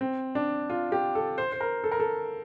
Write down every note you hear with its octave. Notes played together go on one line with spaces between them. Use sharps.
C4
D4
F4
G4
A4
C5
C5
A#4
A4
A#4
A4